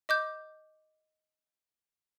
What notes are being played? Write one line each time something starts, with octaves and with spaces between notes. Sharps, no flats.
D#5 D6 G6